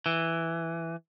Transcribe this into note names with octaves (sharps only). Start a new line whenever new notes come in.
E3